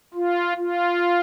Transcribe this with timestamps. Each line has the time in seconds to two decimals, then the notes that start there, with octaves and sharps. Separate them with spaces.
0.14 F4
0.57 F4